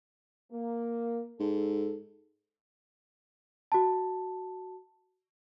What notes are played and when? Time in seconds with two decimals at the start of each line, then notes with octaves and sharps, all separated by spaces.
0.52 A#3
1.40 G#2 A4
3.72 F#4 A5